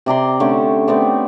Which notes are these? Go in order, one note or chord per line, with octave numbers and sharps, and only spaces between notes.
C3 D5 A#5 C6
D3 A3 C#4 G5
A3 B3 C4 D5